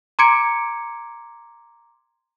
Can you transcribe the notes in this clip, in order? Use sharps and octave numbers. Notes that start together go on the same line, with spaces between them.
A#5 C6 D6 G#6 C#7 D7